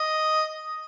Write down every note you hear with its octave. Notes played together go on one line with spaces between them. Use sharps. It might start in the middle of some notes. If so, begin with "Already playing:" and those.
Already playing: D#5